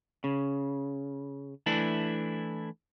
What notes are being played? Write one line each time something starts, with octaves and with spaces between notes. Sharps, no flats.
C#3
E3 A3 D4 E4